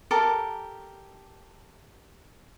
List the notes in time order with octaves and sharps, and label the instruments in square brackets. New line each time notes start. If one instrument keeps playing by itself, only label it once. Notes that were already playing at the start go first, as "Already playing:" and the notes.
[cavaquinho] G4 A4 A#4 D6